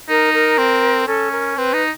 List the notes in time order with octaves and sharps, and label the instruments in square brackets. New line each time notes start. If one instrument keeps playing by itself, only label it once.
[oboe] D#4 [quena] A#4
[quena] A#4
[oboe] C4
[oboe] C#4 [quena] A4
[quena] A#4
[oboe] C4 [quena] B4
[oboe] D#4